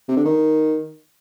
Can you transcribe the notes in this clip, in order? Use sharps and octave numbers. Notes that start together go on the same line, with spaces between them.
C3
D3
D#3